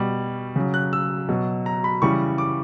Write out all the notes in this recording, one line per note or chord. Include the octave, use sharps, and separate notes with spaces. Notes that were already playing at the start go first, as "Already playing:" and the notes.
Already playing: B2 G3
C#3 F#3
F#6
E6
B2 F#3
A#5
B5
C#3 E3 G3 C#6
D6